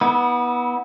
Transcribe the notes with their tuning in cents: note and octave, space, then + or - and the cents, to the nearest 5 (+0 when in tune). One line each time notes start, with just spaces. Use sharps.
B3 -15 E4 -35